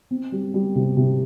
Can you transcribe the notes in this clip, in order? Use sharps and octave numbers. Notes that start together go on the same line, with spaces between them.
C4
G3
G3
C3
C3